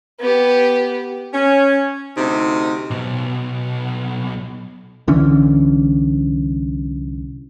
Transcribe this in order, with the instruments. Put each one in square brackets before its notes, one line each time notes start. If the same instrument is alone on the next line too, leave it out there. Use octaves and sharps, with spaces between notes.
[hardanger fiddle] B3 G4
[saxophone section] C#4
D2 C3 D#4
[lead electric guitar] B1 B2
[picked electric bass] C2 D3 E3 C#4